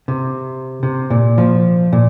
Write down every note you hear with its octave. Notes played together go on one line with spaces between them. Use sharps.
C3
C3
A#2
F3
A#2